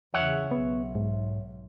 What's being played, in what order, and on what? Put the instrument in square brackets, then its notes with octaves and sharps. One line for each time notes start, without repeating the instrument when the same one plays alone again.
[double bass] E2 C#3 [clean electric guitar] C#5 E5 F#5
[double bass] B1 [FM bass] B3
[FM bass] G#2